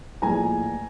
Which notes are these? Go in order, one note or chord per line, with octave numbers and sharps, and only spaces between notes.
A#1 A2 F3 G#3 B3 G#5 A#5